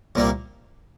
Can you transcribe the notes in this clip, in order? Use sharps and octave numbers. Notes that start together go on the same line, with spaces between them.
C2 A#2 G3 A#3